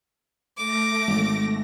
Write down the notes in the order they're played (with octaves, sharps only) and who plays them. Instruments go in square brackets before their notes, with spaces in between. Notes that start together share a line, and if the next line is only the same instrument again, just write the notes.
[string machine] A3 A#6 [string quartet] D6
[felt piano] G#1